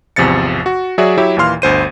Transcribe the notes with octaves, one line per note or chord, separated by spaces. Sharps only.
G#1 E2 C3 F3 A6 C#7
F#4
F#3 F#4 G#4 D5 E5
F#3 E4 G4 C#5 E5
D#2 A#2 E3 F5 C6 F6
G1 D2 C5 D#7